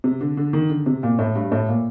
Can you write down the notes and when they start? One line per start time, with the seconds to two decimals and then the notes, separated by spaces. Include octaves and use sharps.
0.04 C3
0.21 D3
0.37 D3
0.53 D#3
0.69 D3
0.86 C3
1.03 A#2
1.19 A2
1.35 G2
1.52 A2
1.68 A#2